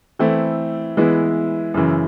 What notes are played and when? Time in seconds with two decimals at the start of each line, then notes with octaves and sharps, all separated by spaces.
0.19 E3 A3 C4 E4
0.97 E3 G#3 B3 E4
1.74 F#2 C#3 E3